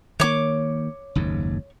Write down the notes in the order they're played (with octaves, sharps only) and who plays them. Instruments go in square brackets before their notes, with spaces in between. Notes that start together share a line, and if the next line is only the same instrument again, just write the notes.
[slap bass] D#3 A#3 [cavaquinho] C#5 D6
[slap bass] F#1 D#2 G#2